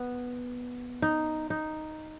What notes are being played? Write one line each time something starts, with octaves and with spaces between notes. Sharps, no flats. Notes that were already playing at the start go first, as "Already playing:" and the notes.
Already playing: B3
D#4
D#4